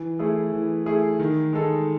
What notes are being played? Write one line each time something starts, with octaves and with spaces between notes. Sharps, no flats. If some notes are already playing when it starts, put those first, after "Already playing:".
Already playing: E3
A3 E4 G#4
E3
A3 E4 G#4
D#3
G#3 D#4 A4